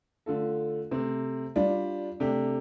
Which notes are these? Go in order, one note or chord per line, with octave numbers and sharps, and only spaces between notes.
D3 A3 F4 A4
C3 A3 C4
G3 D4 F4
C3 A3 D4 G4